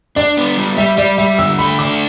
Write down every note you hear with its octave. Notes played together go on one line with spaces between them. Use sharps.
D4 D5
B3
G3
G3 E5
G3 D5
G3 E5
D3 E6
A3 B5
D4 D6